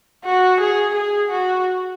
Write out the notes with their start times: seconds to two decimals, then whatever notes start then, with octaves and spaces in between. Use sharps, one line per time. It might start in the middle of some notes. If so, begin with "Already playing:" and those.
0.25 F#4
0.61 G#4
0.95 G#4
1.31 F#4